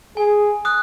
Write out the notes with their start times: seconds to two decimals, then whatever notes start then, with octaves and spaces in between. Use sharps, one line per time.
0.17 G#4 G#5
0.65 D#6 F#6